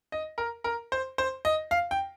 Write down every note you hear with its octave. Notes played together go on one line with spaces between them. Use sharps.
D#5
A#4
A#4
C5
C5
D#5
F5
G5